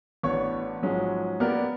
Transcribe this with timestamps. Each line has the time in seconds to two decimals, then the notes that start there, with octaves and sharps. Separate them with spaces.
0.23 A1 B3 D4 C#5 D5 C#6
0.82 G#2 F3 F#3 G#3 C#4
1.40 A#3 B3 G4 A#4 D5 F6